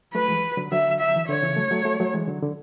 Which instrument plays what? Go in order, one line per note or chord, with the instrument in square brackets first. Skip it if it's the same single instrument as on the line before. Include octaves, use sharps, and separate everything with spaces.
[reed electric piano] F#3 A3 [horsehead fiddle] B4
[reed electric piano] E3 G#3
D3 F#3
[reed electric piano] D3 F#3 [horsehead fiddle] E5
[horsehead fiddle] E5
[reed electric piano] E3
[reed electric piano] D3 [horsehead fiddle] C#5
[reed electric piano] C#3 E3
F#3 A3
F#3 A3
F#3 A3
F#3 A3
E3 G#3
D3 F#3
D3